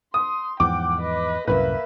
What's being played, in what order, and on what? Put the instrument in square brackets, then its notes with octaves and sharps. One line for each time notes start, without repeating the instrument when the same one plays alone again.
[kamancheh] C6 [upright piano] D#6
[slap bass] E2 G#2 F3 [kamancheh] F#5 G5 [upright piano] D6
[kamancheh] B4 D#5
[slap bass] C2 F#2 A2 [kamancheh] A#3 E5 [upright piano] B4